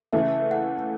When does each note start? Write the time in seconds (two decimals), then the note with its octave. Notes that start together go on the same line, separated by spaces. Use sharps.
0.13 C#3 E3 A3 E5
0.51 F#5